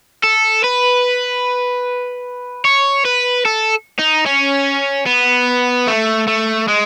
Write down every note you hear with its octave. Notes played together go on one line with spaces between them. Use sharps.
A4
B4
C#5
B4
A4
D#4
C#4
B3
A3
A3
G#3